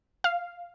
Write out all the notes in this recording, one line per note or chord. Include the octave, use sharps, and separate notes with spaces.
F5